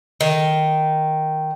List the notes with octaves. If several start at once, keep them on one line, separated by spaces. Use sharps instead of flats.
D#3